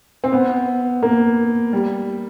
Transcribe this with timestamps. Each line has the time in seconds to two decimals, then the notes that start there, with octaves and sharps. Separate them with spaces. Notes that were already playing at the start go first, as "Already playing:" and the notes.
0.24 C4
0.33 B3
1.02 A#3
1.73 G3